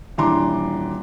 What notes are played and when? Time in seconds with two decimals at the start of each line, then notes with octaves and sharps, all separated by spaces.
0.18 D#1 E3 D4 A#5 C6 D6